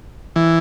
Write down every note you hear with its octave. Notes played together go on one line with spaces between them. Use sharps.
E3